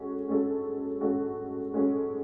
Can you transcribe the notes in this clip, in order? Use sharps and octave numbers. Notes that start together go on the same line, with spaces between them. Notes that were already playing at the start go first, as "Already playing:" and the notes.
Already playing: G#3 C#4 F#4 A4
G#3 C#4 F#4 A4
G#3 C#4 F#4 A4
G#3 C#4 F#4 A4